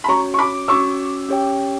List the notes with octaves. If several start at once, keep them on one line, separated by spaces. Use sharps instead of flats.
B5
C#4 F#4 C#5 A#5 C#6
C#6
B5 D6
C#4 F#4 C#5 C#6 E6
C#4 G4 C#5 G5